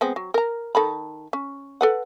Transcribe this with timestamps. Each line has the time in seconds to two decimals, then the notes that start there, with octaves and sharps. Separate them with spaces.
0.01 G#3 B3 C4
0.16 F#3
0.34 A#4 A#5
0.75 D#3 A4 B5
1.33 C#4
1.81 A4 B4 F#5